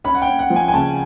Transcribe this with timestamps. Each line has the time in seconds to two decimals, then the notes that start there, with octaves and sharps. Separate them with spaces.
0.04 C#4 B5
0.15 F#5
0.22 G5
0.28 C#4
0.39 F#5
0.50 F3
0.56 G#5
0.68 G#5
0.73 C#3 A5